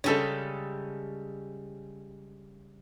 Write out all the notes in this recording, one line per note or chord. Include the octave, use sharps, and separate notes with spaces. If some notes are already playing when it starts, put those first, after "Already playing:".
C#3 G3 G#3 C#4 G4 A4